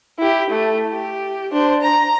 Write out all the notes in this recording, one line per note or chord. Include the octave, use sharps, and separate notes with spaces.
E4 G4
A3
G4
D4 C5
A#5